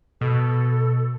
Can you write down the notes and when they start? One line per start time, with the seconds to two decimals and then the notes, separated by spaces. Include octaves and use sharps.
0.21 B2 A4